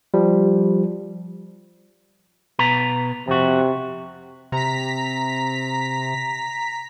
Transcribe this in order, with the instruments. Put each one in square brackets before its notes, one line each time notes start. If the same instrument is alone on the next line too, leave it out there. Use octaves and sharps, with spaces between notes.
[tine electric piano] F3 G3
[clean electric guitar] B2 B4 A#5
[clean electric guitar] F2 F#4 [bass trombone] C3
[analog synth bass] C3 [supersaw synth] A#5 B6